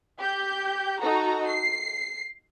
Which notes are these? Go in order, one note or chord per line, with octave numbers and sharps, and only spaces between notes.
G4 G6
D#4 F#4 A4 A#5
C7